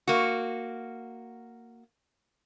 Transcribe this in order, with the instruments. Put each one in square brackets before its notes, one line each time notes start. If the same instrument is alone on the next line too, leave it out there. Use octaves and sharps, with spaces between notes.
[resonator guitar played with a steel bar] A#3 F#4